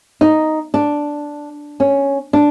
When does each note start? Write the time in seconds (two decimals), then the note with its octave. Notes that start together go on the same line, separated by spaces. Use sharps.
0.21 D#4
0.74 D4
1.80 C#4
2.33 D4